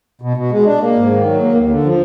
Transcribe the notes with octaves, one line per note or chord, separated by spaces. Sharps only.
B2
B2
G#3
D4
A#3
G#2
D#3
F#3
A#3
D#2
D3
F3